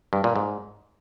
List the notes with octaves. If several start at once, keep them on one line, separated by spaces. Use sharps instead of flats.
G2
A#2
G#2